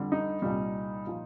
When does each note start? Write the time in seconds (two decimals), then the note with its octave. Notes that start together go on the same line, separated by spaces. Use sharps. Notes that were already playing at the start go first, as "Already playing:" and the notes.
Already playing: F2 D3 G3
0.12 D#4
0.42 C2 A#2 G3
1.07 A#2 F3